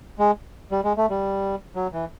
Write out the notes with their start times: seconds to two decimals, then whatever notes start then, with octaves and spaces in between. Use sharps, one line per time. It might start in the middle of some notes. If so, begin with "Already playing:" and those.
0.19 G#3
0.72 G3
0.84 G#3
0.97 A3
1.10 G3
1.75 F#3
1.93 E3